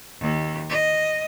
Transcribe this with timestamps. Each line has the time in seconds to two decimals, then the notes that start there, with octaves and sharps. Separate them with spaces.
0.20 D#2
0.69 D#5